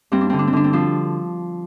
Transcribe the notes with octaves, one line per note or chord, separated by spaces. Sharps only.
G2 C4
D4
D3 C4
D4
C4
D3 D4
C4
F3 D4